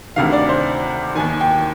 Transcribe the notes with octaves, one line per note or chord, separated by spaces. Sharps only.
D2 C3 D#3 F5
D5
C5
D#2 D#3 G#5
G5